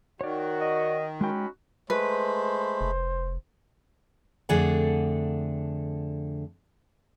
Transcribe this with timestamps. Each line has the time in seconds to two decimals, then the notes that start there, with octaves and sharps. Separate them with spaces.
0.21 D#3 F#4 C#5 D5
0.61 D#5
1.21 G#3 C#4 D#4 F#4 G5 B5
1.90 G#3 A3 B4 C5 B5
2.81 F1
4.49 F2 D3 A3 G#4 D5 F#5